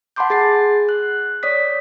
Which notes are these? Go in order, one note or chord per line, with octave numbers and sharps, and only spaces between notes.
F#5 A5 B5 C6 D6 G6
G#4 A6 C7
F#6
C#5 D5 D#6 B6